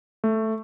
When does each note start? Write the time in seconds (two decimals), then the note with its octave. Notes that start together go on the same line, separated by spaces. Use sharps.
0.24 A3